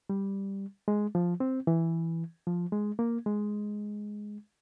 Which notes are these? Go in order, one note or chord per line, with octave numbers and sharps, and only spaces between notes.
G3
G#3
F3
C4
E3
F3
G#3
A#3
G#3